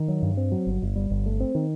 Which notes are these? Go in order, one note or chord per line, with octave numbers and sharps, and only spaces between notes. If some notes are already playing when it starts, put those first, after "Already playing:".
Already playing: D#3
F#3
G2
C4
F#3
G1
G1
G3
G1
A3
C4
D#3